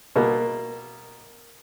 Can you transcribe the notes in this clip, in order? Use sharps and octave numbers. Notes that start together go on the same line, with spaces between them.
B2 A#3